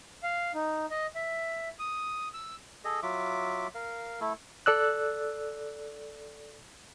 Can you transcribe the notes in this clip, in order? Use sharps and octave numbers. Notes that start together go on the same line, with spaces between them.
F5
D#4
D#5
E5
D#6
E6
G#4 A4 D#5
F#3 F4 E5 D6
A#4 F5
A3 E4 A4
A4 D5 E6 F#6